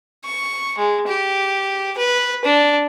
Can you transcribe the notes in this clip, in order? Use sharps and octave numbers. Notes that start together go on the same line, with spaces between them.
C#6
G#3
G4
B4
D4